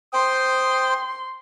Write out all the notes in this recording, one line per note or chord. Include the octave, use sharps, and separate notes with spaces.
C5 G5 C6 D#6